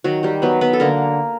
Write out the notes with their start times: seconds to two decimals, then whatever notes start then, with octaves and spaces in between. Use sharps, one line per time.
0.04 D#3 F#3 F#4
0.23 G3 G4
0.42 F#3 B3 B4
0.61 B3 B4
0.73 A4
0.80 D3 A#3 A#4